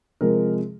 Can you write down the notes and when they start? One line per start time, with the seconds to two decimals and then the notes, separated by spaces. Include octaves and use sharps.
0.21 C3 F3 G#3 A#4